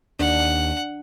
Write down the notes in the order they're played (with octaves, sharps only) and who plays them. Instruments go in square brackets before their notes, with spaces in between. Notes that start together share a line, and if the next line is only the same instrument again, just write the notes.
[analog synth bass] D#2 [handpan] D4 [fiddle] F#5